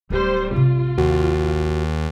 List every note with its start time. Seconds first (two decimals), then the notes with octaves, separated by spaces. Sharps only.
0.10 D1 G3 D#4 C5
0.53 A1 C3 F4
0.98 D#2 F#4